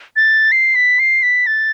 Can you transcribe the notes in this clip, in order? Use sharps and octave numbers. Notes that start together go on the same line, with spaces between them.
A6
C7
B6
C7
B6
A6